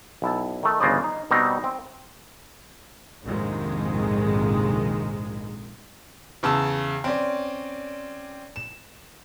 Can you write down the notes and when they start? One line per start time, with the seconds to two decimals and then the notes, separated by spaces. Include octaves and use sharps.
0.22 B1 E4 A5
0.63 D#3 A3
0.80 G1 C#3 E3 C5 D5 D#5
1.04 D#4
1.31 B2 G3 C4 D#4
1.64 C4
3.25 A#1 F2 G#2 C3 D#3 G#3
6.43 E2 C#3 A5 E6
7.04 C4 C#4 D5
8.56 E7